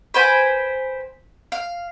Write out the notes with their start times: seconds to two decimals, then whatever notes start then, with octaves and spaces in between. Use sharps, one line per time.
0.14 B4 C5 G5 G#5
1.52 F5